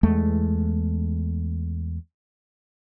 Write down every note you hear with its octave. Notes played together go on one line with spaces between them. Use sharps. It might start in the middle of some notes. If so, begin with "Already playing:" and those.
E2 G#3 A3